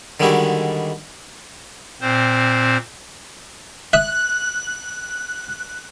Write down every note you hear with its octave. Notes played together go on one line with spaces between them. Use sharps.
D3 D#3 G3 G#3 E4 F#4
A#2 C4 C5
E5 D#6 F#6